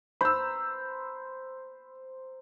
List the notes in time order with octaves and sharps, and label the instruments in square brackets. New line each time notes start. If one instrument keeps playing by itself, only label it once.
[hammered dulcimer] C5 A#5 [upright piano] B5 E6